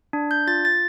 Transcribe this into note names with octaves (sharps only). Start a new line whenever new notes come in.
D4
G6
F4 A6
A6